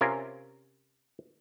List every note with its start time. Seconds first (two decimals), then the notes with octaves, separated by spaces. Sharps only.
0.01 C3 C#4 F4 A#4 G#5